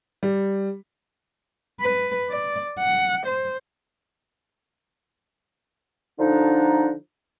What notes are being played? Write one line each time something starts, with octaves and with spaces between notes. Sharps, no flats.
G3
B4
D5
F#5
C5
D3 F3 D4 D#4